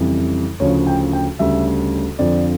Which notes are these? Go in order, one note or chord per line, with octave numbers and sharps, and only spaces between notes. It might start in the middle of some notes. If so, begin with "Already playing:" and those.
Already playing: F2 C#3 E3 G3
D2 C#3 F3 C#5
G5
G5
D2 C#3 G3 E5
F2 D3 F3 D5